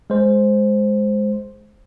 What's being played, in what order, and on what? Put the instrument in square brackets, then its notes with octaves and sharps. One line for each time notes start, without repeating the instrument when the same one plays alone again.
[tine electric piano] G#3 C5